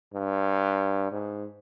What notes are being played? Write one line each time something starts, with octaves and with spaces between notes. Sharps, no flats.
G2
G#2